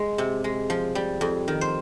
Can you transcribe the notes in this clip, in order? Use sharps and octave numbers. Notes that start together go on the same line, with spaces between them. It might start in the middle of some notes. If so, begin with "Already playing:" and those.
Already playing: G#3
C3
G#3
F3
G3
F2
D#3
C5